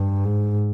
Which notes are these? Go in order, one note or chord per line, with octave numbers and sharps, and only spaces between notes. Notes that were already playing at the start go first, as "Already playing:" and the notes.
Already playing: G2
G#2